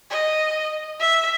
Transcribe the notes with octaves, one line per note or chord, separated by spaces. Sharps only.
D#5
E5